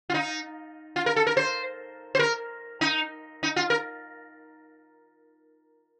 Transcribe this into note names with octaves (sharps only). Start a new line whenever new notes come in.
F4
D#4
F4
A#4
A4
A#4
C5
C5
A#4
D#4
D#4
F4
A#4